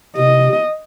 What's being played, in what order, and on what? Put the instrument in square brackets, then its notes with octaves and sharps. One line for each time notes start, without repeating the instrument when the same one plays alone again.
[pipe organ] C3 [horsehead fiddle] D#5